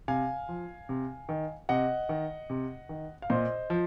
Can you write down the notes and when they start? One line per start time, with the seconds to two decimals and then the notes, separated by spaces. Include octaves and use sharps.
0.08 C3 F5 G#5
0.49 F3
0.89 C3
1.29 D#3
1.69 C3 D#5 F#5
2.09 D#3
2.50 C3
2.89 D#3
3.22 F5
3.30 A#2 C5 D#5
3.70 F3